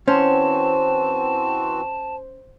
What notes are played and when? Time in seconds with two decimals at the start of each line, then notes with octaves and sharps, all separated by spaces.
0.08 E3 C4 C#4 F#4 C5 A5